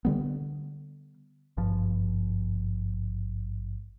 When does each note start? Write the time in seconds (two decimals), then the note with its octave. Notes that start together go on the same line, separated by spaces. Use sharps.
0.05 D3 G3 B3
1.57 G#1 G2 F3